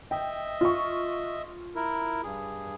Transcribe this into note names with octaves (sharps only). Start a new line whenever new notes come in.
D#5 E5 G5
F4 C#6
E4 A#4
G2 G#4